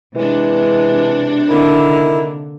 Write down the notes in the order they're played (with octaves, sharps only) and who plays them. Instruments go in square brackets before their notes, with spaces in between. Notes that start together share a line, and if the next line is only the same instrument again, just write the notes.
[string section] C3 D4 [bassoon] E3 [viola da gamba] G#3
[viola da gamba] D3 A#3 [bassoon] D#3 [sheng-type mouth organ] E4